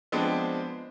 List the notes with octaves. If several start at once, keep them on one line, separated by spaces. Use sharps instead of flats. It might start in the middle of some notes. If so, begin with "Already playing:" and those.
F3 G#3 B3 C4 D4